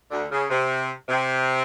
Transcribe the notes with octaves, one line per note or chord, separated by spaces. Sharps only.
D2 D3
C#3
C3
C3